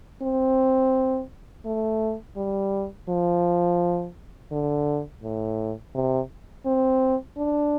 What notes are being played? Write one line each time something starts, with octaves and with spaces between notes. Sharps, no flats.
C4
A3
G3
F3
D3
A2
C3
C4
D4